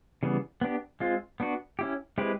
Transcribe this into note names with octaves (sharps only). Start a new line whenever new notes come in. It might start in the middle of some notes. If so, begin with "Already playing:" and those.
C#3 E3 G3 B3
B3 D4 G4
G#3 C4 F4
B3 D4 F#4
C#4 E4 G4
G#3 C4 E4 G4 B4